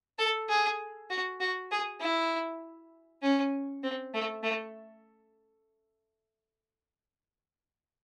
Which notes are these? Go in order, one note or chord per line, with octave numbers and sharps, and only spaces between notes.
A4
G#4
F#4
F#4
G#4
E4
C#4
C4
A3
A3